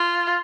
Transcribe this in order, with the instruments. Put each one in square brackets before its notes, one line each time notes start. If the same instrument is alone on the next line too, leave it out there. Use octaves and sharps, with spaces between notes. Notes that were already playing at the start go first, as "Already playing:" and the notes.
Already playing: [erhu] F4